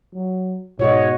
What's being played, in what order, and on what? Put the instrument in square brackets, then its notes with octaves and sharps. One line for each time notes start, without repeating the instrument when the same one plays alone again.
[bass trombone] F#3
[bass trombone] G#2 [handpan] B2 F#4 D#5 [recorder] C#5